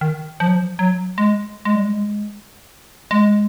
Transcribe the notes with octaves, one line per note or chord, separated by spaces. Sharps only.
D#3
F3
F#3
F3
F#3
G#3
G#3
G3
G#3
G#3